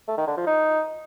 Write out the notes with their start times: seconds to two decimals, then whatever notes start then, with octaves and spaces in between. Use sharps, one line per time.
0.08 A3
0.18 D#3
0.27 D3
0.37 F3
0.47 D#4